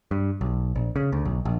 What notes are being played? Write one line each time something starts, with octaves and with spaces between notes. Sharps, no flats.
G2
B1
A#1
C#3
D2
B1
A#1